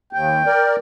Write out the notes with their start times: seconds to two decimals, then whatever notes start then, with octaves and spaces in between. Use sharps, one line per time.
0.13 D#2 G5
0.46 A#4 D5